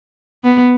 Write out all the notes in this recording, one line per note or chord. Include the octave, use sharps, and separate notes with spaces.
B3